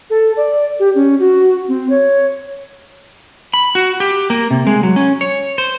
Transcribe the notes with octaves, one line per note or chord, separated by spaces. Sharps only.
A4
D5
G4
C#4
F#4
C4
C#5
B5
F#4
G4
A#3
C3
G#3
F#3
C#4
C#5
C5